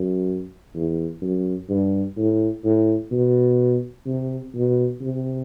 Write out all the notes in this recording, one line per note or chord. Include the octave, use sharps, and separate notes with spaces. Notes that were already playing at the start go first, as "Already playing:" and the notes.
Already playing: F#2
E2
F#2
G2
A2
A2
B2
C3
B2
C3